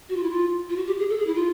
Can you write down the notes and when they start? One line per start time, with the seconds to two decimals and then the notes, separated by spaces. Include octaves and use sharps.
0.09 F#4
0.16 F4
0.23 E4
0.30 F4
0.69 F4
0.76 F#4
0.87 G4
0.99 G#4
1.10 A4
1.18 G#4
1.27 E4
1.36 F4